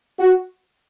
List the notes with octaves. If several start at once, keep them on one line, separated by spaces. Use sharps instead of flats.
F#4